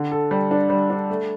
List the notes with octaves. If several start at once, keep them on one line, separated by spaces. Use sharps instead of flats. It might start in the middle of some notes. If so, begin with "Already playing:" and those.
Already playing: D3
A4
G3
D4
G3
D4
A3